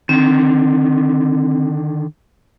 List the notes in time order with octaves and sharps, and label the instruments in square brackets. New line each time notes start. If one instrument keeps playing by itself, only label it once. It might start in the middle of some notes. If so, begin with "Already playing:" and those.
[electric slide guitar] D3 D#3 [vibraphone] C4